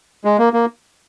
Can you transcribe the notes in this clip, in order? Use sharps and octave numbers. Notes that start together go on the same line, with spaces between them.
G#3
A#3
A#3